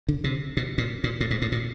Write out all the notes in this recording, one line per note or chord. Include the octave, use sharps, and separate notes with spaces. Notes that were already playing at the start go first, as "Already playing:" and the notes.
D3
C3
B2
A#2
A#2
A2
G#2
A2
A#2